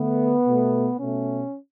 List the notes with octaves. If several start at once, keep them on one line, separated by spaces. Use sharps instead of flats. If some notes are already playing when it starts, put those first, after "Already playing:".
Already playing: D3 A3 B3
B2 A3
B2 A3 C#4